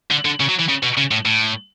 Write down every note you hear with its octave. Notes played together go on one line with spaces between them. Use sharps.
D3
D3
C#3
F#3
E3
C#3
B2
C#3
A2
A2